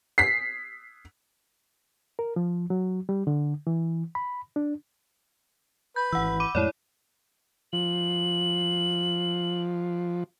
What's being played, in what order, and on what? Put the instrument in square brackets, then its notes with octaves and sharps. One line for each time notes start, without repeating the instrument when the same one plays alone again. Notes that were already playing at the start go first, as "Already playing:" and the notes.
[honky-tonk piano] B6 C7
[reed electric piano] A#4
F3
F#3
G3
D3
E3
B5
D4
[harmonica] B4 [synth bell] G6
[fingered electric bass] G#1 E3 [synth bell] F#5 E6
[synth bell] B5 D6 D#7
[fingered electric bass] F2 A2 G#3 [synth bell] E4 C#5 D5
[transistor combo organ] F3 [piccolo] F#7